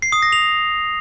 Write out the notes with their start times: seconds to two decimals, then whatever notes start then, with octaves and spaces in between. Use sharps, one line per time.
0.02 C7
0.12 D#6
0.22 A#6
0.32 F7